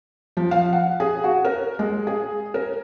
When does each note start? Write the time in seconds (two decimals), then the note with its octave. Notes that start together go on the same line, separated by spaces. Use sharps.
0.37 F3
0.51 F5
0.73 F#5
1.00 G#4
1.24 F#4
1.45 A#4
1.79 G#3
2.07 G#4
2.54 A#4